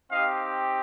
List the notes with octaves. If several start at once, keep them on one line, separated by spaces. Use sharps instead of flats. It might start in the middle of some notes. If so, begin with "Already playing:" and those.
C4 D#4 G4 D#5 F5